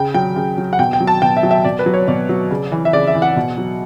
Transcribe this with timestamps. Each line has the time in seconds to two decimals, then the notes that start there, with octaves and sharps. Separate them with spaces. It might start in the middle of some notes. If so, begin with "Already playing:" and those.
Already playing: C#3 G5
0.14 F#3 G5
0.36 C#3
0.58 F#3
0.73 F#5
0.79 B2 G5
0.93 G5
1.00 F#3
1.07 A5
1.22 B2 G5
1.37 E5
1.43 F#3
1.51 E5
1.65 B2 D5
1.79 B4
1.86 F#3
1.94 C#5
2.08 B2 D5
2.29 F#3
2.51 C#3
2.72 E3
2.85 E5
2.93 C#3 D5
3.07 E5
3.15 E3
3.22 F#5
3.36 B2
3.58 F#3